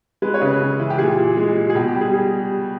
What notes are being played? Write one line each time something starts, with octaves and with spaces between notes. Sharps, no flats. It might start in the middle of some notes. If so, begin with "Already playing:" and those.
G#3 B4
C#5
C#3 B4
C#3
E3
G4
A#2 G#4
A#2
G#3
A#2
G#4
B2 G4
G4
G3
G#4
G3 G#4